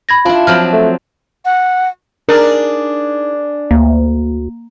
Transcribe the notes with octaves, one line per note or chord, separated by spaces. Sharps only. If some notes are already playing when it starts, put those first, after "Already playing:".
B5 G#6 A#6
D4 E4 F4
F3 F#3 C4 F6 F#7
A3
F#5
D4 D#4 G#4 A#4
D2 A#3